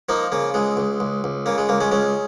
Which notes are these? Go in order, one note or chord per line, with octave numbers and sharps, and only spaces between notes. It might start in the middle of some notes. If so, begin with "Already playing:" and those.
F3 A#3 D#4
C#3 A#3
C#2 G#3
C#2
C#2
C#2
C#3 A#3
G#3
C#2 A#3
G#3 C#4
C#2 G#3 C#4